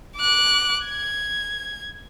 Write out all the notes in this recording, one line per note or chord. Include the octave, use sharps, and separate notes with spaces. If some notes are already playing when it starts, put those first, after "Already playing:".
D6 F#6
G#6